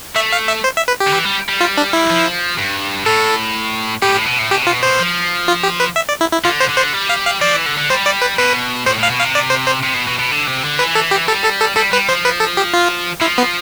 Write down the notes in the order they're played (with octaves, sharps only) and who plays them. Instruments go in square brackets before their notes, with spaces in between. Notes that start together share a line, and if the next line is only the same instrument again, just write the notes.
[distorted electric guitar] A3 [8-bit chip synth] E5
[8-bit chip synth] F5
E5
C5
E5
B4
G4
[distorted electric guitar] D3
E3
G3
G3
[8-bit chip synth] F4
D4
E4
[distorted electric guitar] F3
G2
[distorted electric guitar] A2 [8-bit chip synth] A4
[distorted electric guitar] A2 [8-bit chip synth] G4
[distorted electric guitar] A2
B2
A2
[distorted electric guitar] B2 [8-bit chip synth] G4
[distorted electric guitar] C3 [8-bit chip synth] F4
[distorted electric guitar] B2
[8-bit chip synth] C5
[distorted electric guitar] F3
[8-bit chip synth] F4
G4
B4
E5
D5
E4
E4
[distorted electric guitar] D3 [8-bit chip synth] F4
[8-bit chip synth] C5
[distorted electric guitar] D3
[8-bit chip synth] C5
[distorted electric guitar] G3
[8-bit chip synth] F5
F5
[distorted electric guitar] F3 [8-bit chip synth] D5
[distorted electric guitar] E3
D3
D3
[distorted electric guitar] G3 [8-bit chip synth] C5
[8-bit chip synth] D5
B4
[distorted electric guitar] B2 [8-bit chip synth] B4
[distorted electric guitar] A2 [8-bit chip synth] C5
[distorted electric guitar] A2 [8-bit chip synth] F5
[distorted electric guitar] B2
[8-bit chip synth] F5
[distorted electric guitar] C3
[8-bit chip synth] D5
C5
C5
[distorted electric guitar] C3
B2
B2
B2
D3
C3
D3
[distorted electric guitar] E3 [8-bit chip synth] B4
[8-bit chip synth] A4
G4
[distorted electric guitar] G3 [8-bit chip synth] A4
[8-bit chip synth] A4
A4
[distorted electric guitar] G3 [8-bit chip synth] A4
[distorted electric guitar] G3 [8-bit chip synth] B4
[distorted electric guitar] F3 [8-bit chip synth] C5
[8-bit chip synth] B4
A4
G4
F4
[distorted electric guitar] F3 [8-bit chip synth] E4
[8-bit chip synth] B3